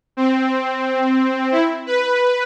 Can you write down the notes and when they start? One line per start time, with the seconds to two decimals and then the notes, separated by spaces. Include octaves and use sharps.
0.17 C4
1.52 E4
1.86 B4